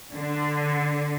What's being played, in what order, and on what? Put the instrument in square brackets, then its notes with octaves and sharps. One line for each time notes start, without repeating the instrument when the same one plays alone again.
[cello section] D3